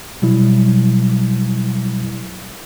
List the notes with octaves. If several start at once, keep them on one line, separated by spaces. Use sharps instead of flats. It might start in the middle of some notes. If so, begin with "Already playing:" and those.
B2 F#3 G3 E4